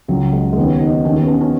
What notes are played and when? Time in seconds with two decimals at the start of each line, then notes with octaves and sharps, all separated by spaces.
0.08 C#2 C#3 F#3
0.33 G#3
0.53 G#3
0.56 D#2 C#3 B3
0.81 D#4
1.05 D#2 D#3 C#4
1.16 B3
1.28 C#4
1.41 C#4